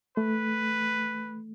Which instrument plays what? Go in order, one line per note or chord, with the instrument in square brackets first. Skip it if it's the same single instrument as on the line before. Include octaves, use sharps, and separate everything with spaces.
[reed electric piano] A3 [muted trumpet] B4